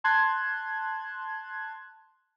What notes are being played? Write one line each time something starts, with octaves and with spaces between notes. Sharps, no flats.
A5 C6 F#6 G#6